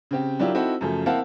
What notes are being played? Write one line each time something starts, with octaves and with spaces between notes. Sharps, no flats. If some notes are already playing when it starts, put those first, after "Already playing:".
C#3 C4 G4
F#3 D4 E4 F4 G4 A#4
C4 D#4 E4 F#4 A4
F#2 C#3 F3 A3
A#3 C4 E4 F5 F#5 A5